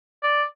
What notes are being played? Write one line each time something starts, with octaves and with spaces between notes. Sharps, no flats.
D5